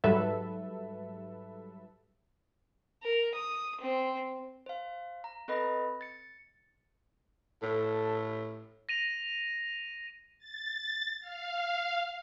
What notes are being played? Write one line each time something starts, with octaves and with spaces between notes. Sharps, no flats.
G#2 F#3 G3 A4 B4 E5
A#4
D#6
C4
C5 F5
A#5
C4 A4 B4 D#5 B5 A#6
A6 C#7
A2 A4
A#6 D#7 F7
A6
F5